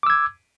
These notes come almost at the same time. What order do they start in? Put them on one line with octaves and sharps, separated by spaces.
D6 E6 G#6